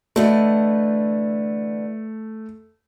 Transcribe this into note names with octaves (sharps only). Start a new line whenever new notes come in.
D3 E3 A3 D#5